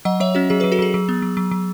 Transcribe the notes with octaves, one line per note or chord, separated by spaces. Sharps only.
F#3 D#5 F#5
F#3 C#5 E5
C#4 F#4
F#3 G#4
F#3 G#4 B4
F#4 A4
F#3 G#4
F#3
B3
F#3
F#3
F#3